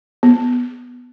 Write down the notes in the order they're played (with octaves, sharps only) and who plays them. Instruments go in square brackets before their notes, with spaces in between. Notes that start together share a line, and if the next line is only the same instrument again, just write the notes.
[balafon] B3